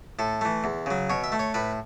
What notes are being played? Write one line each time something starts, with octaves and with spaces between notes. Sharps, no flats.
A2 A4
E3 A3
E2
C#3 F#3
B2 C#5
E5
A3
C#5
A2 B4